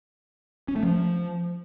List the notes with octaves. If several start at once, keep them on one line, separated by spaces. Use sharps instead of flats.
C#4
A3
F3